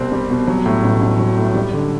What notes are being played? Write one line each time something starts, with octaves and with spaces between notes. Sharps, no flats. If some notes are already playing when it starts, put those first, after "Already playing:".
Already playing: C2 B2 G3 C4
G3
B2
F#3
A2
A1
A1
F#3
A2
G3
D3